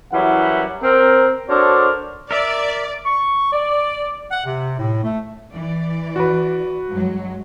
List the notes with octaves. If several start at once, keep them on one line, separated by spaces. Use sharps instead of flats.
F#2 E3 F#3 G3 E4 F#5
C4 A#4
D4 F#4 A4 A#4 C5 C#5
A#4 D5 E5
C#6
D5
F#5
C3
A2
A3
E3 D5
F#4 B4
G2 F#3 G#3